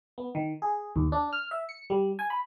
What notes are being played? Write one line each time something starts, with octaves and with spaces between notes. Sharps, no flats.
B3
D#3
G#4
D#2
D4
F6
E5
C#7
G3
G#5
B5